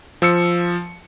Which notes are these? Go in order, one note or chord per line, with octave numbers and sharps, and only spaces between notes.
F3 E6 C#7